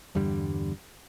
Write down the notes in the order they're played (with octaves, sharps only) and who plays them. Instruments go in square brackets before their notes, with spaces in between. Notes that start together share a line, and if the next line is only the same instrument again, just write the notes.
[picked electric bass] E2 G2 D3 G3